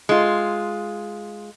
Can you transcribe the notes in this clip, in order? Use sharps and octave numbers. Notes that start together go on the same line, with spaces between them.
G#3 F4